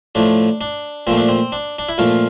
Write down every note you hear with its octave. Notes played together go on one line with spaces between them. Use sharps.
A2 F3 A3 D4
D4
A#2 F3 A3 C4
D4
C4
D4
D4
E4
A#2 F3 A3 F4